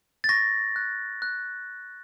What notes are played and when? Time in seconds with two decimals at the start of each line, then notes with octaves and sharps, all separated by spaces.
0.24 A6
0.29 C#6 A#6
0.76 F#6
1.22 F#6